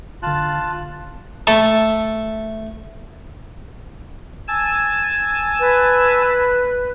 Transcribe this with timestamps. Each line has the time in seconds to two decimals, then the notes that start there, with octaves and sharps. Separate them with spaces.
0.23 G1 D3 F4 A5 F#6
1.47 A3 A4 E5
4.48 G#5 A5 E6
5.60 B4